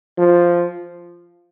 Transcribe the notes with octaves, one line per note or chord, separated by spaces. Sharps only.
F3